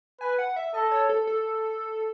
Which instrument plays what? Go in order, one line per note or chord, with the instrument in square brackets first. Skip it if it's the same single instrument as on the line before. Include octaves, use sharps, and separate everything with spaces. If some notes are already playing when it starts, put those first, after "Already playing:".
[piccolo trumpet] B4 [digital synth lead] G#5
[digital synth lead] F#5
E5
[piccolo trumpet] A4 [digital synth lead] D#5
[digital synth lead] C#5
A4
A4